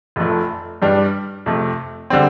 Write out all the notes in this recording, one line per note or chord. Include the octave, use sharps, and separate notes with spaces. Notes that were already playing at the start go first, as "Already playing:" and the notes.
F1 F2 F3 A3
G2 G3 D4
F2 C3 A3
D3 G3 C4